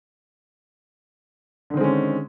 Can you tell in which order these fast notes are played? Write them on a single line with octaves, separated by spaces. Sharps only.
D3 D#3 C4 G#3 C#4